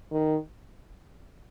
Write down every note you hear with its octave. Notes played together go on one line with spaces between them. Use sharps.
D#3